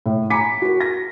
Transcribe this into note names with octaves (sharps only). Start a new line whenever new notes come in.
A2
G#5 A#5 B5 D6 B6 C#7
F#4 A#4
A#6